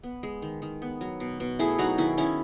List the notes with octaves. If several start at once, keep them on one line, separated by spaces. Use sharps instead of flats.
B3
G#3
D#3
D#3
B3
F#3
B2
B2
A3 E4 G#4
F#3 D#4 F#4
D#3 E4 G#4
D#3 C#4 E4